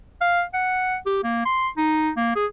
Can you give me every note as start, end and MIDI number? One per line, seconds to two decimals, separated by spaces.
0.21 0.43 77
0.54 0.97 78
1.06 1.20 67
1.24 1.44 58
1.45 1.68 84
1.77 2.10 63
2.17 2.35 58
2.36 2.46 68